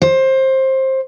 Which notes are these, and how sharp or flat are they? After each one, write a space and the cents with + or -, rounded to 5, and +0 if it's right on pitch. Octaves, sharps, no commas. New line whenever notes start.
C5 +20